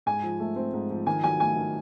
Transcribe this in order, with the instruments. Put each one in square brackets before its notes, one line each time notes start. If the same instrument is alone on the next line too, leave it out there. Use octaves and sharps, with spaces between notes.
[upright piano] G#2 [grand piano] G#5
[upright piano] F3
A3
C4
G#2
F3
[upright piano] D#3 [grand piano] G#5
[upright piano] F#3 [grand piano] G#5
[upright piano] A3 [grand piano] G#5
[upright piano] D#3